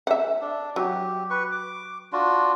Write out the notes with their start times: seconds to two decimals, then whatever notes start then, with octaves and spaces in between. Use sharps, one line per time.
0.07 E5 F#5
0.41 D4
0.76 F#3 G4
1.30 B4 C#6
1.51 D6
2.13 D4 F4 F#4